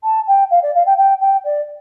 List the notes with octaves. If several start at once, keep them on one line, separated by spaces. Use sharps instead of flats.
A5
G5
F5
D5
F5
G5
G5
G5
D5